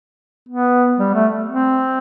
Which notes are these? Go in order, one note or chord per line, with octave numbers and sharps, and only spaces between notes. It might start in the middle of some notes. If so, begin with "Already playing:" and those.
B3
G3
A3
C4